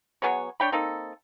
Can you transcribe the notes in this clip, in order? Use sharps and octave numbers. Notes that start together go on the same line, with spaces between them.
F#3 B3 G#4 C#5
D4 C#5 G5 B5
A#3 C4 D#4 A4